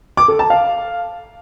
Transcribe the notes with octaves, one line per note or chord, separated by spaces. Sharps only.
D6
A4
A5
F5